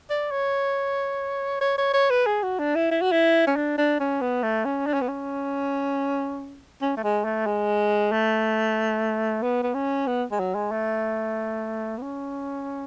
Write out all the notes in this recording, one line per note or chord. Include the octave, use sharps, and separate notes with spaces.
D5
C#5
C#5
C#5
C#5
B4
G#4
F#4
D4
E4
E4
F#4
E4
C#4
D4
D4
C#4
B3
A3
C#4
D4
C#4
B3
C#4
C#4
A3
G#3
A3
G#3
A3
B3
B3
C#4
B3
G#3
F#3
G#3
A3
B3
C#4